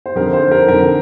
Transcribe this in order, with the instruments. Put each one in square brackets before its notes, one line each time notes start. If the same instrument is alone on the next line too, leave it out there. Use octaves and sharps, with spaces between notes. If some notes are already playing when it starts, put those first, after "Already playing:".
[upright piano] C5
F2 A#4
D3
C5
A#4
F2 D3 A#4